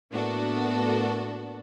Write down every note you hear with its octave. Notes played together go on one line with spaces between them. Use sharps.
A2 A#3 B3 D4 F#4 A4